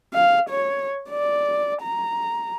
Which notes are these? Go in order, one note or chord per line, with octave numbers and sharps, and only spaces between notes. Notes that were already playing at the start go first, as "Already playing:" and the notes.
F5
C#5
D5
A#5